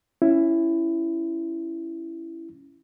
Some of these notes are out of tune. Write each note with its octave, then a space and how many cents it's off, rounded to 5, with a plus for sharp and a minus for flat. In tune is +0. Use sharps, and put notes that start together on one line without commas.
C#4 +0 E4 +10